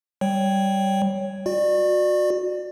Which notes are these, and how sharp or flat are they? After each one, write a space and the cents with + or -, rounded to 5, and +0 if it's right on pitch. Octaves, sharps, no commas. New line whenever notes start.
G3 -10 C#5 +0 G5 +0
F#4 -25 D5 +25